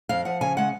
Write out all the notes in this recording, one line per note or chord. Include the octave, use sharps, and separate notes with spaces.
F2 F5
F3 F#5
C#3 G#5
G#3 F#5